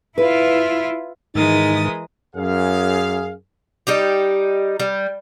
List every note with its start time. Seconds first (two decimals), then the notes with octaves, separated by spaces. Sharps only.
0.18 E4 F4 B4
1.35 G#2 D#3 E3 G#3 D#4 A#4 D#6 A6
2.36 F#2 G#4 F5
3.87 G3 D#4 G4
4.80 G3